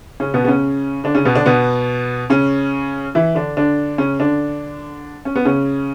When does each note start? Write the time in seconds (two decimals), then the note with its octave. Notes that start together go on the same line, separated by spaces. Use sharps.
0.20 C#3 C#4
0.34 B2 B3
0.44 B3
0.48 C#3 C#4
1.04 D3 D4
1.15 C#3 C#4
1.25 B2 B3
1.35 D3 D4
1.46 B2 B3
2.30 C#3 C#4
3.15 E3 E4
3.35 D3 D4
3.57 D3 D4
3.98 C#3 C#4
4.20 D3 D4
5.25 C#4
5.35 B3
5.45 C#3 C#4